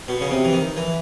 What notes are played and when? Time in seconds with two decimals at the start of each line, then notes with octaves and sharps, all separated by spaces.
0.08 B2
0.21 C#3
0.31 C3
0.44 E3
0.53 D#3
0.77 E3